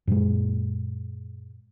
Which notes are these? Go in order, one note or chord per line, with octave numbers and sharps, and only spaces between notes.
F#2 A#2 G#3